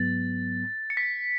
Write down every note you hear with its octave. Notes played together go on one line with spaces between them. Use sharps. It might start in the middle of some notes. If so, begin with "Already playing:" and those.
Already playing: G#2 F#3 B3 A6
C#7
B6